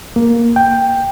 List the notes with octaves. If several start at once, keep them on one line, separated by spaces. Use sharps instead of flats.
A#3
G5